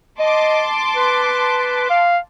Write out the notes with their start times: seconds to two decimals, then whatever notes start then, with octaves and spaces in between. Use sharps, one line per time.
0.19 D#5 A5 C6 D6
0.95 B4
1.90 F5